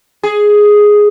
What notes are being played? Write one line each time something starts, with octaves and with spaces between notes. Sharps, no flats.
G#4